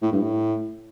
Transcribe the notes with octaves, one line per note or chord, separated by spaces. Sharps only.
A2
G2
A2